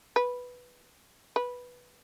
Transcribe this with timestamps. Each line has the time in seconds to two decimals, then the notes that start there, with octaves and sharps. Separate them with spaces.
0.16 B4
1.36 B4